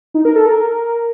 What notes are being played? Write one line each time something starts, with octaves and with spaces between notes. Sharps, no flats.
D#4
A#4
A4
A#4